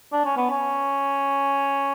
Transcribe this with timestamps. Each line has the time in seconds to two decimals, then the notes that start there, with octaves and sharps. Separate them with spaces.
0.13 D4
0.25 C#4
0.37 B3
0.50 C#4